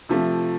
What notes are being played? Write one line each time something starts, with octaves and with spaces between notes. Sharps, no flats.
C3 F3 A3